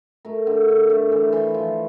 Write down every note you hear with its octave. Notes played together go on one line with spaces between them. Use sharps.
A3 A#4
D3
D3
A3
E3
E3
F3